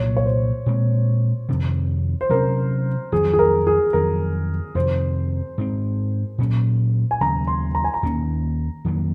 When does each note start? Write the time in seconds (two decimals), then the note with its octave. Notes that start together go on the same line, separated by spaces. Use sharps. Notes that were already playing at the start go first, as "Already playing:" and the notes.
Already playing: C2 A#2 F#3 C#5
0.17 C#5
0.26 C5
0.66 A#2 G#3 C4
1.49 F2 C3 D#3
2.21 C5
2.30 C3 F#3 C#4 A#4
3.12 F2 D#3 F#3 G#4
3.33 G#4
3.39 A#4
3.67 G#4
3.93 F2 D#3 F#3 A#4
4.75 F2 C3 D#3 C5
5.58 G#2 F3 C4
6.38 A#2 F#3 C#4
7.11 G#5
7.21 D#2 C#3 F#3 A#5
7.47 C6
7.75 A#5
7.84 G#5
7.94 A#5
8.03 D#2 D#3 A#3 C#4
8.85 F2 D#3 F#3 A#3